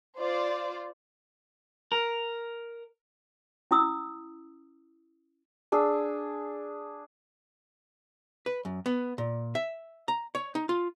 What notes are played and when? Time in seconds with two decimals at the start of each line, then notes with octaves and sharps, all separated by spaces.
0.18 F4 C5 D5
1.92 A#4
3.71 C#4 E4 D#6 E6
5.72 D4 G#4 E6
8.46 B4
8.65 F#2
8.86 B3
9.18 A#2
9.55 E5
10.08 A#5
10.35 C#5
10.55 D#4
10.69 F4